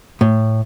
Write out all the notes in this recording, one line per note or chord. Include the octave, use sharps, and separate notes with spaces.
A2